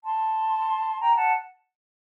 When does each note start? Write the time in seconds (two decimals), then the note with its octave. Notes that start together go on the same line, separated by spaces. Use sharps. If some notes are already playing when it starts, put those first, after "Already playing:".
0.04 A5 C6
1.00 G5 A#5
1.16 F#5 A5